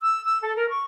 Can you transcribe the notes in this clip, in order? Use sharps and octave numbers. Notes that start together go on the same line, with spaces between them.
E6
E6
A4
A#4
C#6